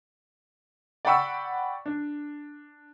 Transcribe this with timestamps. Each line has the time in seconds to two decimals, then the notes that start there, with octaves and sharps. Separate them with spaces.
1.05 D5 F#5 G5 B5 C#6 E6
1.86 D4